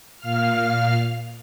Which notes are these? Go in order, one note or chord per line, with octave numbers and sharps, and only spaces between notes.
A#2 F5 F6